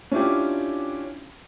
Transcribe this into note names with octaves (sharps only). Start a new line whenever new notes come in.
C#4 D4 E4 F4 G4